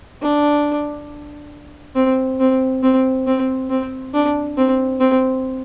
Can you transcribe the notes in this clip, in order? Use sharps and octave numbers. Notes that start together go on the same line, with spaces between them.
D4
C4
C4
C4
C4
C4
D4
C4
C4